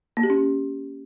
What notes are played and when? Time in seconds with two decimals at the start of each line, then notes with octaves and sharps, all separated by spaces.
0.17 A#3
0.23 G4
0.30 C#4